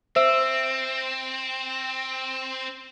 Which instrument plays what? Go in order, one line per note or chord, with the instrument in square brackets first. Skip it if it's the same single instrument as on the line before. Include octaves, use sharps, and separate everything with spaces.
[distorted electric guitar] C4 [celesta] C5 E5 E6